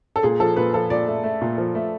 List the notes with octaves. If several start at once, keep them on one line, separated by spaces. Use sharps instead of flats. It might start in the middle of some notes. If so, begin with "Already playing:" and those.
A4
A#2 G#4
F3 A4
A#2 B4
F3 A4
A#2 D5
A3
A3
A#2
F3
A3